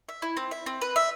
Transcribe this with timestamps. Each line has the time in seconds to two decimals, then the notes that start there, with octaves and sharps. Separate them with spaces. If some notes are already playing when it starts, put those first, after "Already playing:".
0.09 E5
0.22 E4
0.37 C4
0.51 E5
0.66 C4
0.81 B4
0.96 E5